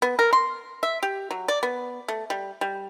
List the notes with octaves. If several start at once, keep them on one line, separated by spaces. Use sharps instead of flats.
B3
A#4
C6
E5
G4
F#3
D5
B3
A3
G3
G3